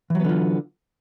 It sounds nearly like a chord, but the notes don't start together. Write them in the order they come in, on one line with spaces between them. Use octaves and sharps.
E3 F#3 B3 D3 F4